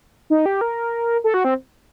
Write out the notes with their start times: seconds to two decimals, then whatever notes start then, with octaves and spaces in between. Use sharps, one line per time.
0.30 D#4
0.46 G4
0.61 A#4
1.24 A4
1.34 F#4
1.45 C4